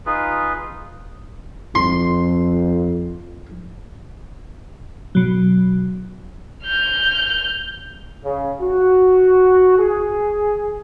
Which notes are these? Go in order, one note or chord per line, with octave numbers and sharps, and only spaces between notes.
D#4 F4 G#4 B4
F2 C6
B2 F#3
F6 G6
C#3
F#4
G#4